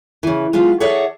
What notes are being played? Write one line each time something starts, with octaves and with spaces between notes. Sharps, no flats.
C#3 E3
G#3 B3 F4 F5
G#4 A4 C#5 D5 E5 F#5